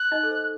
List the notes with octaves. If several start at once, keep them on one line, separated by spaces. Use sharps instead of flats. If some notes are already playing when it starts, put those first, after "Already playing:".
Already playing: F#6
D#4 D#5
A4
C5